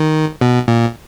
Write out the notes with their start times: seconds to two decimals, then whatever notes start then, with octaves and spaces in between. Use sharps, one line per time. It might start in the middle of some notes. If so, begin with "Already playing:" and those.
Already playing: D#3
0.41 B2
0.68 A#2